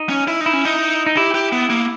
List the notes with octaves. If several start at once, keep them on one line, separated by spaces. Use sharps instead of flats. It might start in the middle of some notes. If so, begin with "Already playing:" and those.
Already playing: D#4
C#4
E4
D#4
E4
C#4
D#4
D#4
E4 G4
G4
B3
A#3